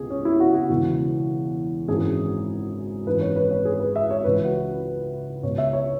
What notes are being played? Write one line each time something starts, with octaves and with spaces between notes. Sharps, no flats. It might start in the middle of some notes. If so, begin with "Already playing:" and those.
Already playing: C#2 B2 G#4
C#4
E4
F#4
F#4
E1 E2 C#3 E3
G#1 F#2 E3 G#4
G#1 F#2 E3 B4
C#5
B4
C#5
G#4
B4
E5
C#5
C#2 C#3 E3 B4
F#4
C#2 B2 C#5
E5
C#5